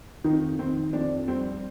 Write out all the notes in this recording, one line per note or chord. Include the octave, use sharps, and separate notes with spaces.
F2 D#3 D#4
D#3 C4
F2 D4
G3 C4